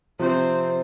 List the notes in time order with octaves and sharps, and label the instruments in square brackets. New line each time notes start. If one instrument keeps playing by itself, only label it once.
[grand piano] C3 F3 [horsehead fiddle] C4 C5